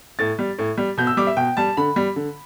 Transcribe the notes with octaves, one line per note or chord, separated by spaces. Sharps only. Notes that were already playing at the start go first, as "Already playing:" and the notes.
A2 A6
G3
A2
G3
B2 G6
E6
G3 D6
E5
B2 G5
G3 A5
D3 B5
G3
D3